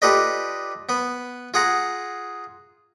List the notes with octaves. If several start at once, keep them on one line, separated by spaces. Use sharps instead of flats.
F4 G4 A4 B4 D5 D#5
B3 B4
F4 G#4 F#5 A#5